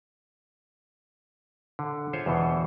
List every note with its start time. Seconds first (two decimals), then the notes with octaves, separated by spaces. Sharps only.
1.79 D3
2.13 F4 G#4 C5 C#5 E5
2.26 E2 B2 E3